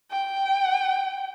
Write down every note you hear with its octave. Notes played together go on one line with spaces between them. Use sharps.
G5